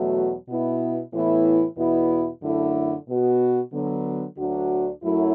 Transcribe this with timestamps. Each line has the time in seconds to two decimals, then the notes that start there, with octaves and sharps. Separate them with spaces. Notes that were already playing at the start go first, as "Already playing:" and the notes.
Already playing: E2 B2 F#3 A3 F#4
0.48 B2 B3 E4
1.13 A2 E3 B3 E4
1.77 E2 B2 B3 E4
2.42 F#2 D3 A3 E4
3.08 B2 B3 F#4
3.73 D3 F#3 B3
4.37 D2 D3 F#3 D4 F#4
5.03 F#2 F#3 A3 E4